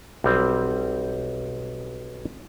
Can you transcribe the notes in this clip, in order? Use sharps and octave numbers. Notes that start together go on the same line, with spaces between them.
B1 G3 C4